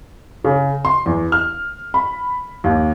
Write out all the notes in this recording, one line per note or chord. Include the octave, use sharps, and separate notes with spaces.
C#3
C6
E2
F6
B5
D#2